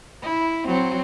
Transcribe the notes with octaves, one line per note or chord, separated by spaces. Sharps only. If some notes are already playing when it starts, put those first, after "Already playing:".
E4
F#3 C4